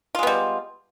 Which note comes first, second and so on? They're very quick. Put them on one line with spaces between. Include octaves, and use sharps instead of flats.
F4 G#3 B3 G3